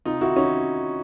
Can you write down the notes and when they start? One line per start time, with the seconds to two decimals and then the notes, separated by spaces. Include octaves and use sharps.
0.05 C3 D#4 F4
0.21 D#3 E4 F#4
0.36 C#4 D#4